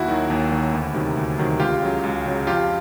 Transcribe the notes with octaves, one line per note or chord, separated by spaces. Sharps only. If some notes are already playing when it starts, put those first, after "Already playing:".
Already playing: D#2 E4 F#4
D#3 F#3
D#2
D#3 F#3
D2
C3 D#3 F#3
D2
C3 D#3 F#3
C#2 F4 G4
C#3 F#3
C#2
C#3 F#3
F2 F4 G4